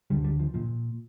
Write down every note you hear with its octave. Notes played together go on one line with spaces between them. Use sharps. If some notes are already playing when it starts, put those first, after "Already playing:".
D2 D3 G3
G3
F3
A#2 F3